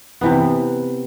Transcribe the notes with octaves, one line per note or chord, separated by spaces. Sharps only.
C3 E3 B3